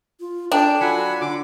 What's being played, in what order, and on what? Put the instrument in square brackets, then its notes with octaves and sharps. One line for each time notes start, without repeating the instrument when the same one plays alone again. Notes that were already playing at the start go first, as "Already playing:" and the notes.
[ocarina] F4
[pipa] D4 [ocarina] A4 [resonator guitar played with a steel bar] G5
[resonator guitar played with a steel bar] F#3 [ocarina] F4 [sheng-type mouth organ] F#5 G#5 B5
[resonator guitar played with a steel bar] D3 [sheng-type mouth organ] D6